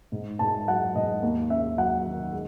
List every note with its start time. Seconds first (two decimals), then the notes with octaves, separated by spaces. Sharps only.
0.12 G#2
0.39 G#2 A5
0.68 F#3 F#5
0.95 G#2 D#5
1.22 D#2
1.50 C#4 E5
1.78 F#3 F#5
2.06 D#3
2.33 G#3